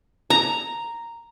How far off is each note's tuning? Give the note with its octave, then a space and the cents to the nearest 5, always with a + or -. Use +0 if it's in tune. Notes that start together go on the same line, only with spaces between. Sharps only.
A#5 -5